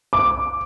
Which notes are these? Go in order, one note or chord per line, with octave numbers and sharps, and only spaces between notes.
D6